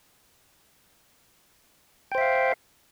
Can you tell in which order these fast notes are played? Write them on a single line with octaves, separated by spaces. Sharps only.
G5 C5 E5 F5